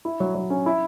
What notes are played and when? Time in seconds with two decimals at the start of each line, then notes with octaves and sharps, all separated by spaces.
0.05 E4
0.20 F#3
0.35 F#3
0.50 C#4
0.66 E4